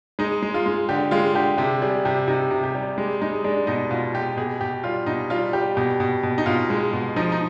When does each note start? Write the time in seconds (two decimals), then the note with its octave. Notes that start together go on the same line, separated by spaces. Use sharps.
0.19 G#3 D#4
0.42 G#3
0.54 F4
0.66 G#3
0.89 D3 G4
1.11 G#3 F4
1.35 D3 G4
1.58 C3 G4
1.82 G3 G#4
2.05 C3 G4
2.28 C3 D#4
2.51 C3
2.64 G4
2.75 G3
2.98 G#3
3.21 G#3 D#4
3.44 G#3 D4
3.67 B2 D#4
3.91 B2 F4
4.14 B2 G4
4.37 B2 G#4
4.61 B2 G4
4.84 G3 F4
5.06 B2 D#4
5.30 G3 F4
5.53 G3 G4
5.77 B2 G4
6.00 B2
6.23 B2
6.38 D#4
6.46 B2 F4
6.70 G#3
6.93 B2
7.16 F3 D#4
7.32 D#4